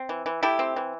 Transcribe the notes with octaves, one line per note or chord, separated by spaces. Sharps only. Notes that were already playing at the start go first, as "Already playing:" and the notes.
Already playing: C4
E3
E3
A3 E4 G4
C4
E3